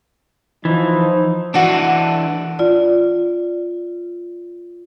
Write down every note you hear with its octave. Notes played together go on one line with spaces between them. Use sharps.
E3 F3 D#4
E3 D4 F#4 A4
F4 D5